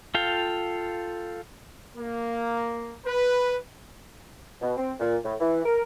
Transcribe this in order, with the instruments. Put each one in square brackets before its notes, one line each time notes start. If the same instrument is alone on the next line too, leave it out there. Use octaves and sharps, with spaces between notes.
[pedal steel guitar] F4 A4 F5 G5
[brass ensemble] A#3
B4
[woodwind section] B2
C4
A#2
A2
E3
A#4